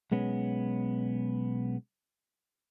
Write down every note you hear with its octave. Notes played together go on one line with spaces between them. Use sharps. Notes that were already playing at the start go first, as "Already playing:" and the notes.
B1 G#3 B3 C#4